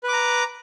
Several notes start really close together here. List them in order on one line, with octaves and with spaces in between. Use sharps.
B4 D6 A#5